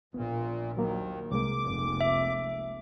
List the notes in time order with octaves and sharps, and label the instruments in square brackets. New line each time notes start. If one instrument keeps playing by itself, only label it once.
[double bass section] A#1 [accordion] A#2 [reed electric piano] B3
[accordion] D#2 D#3 [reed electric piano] F#3 A#3 A#4
[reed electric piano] C2 G#3 A#3 [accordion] D6
[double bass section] F1
[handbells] E5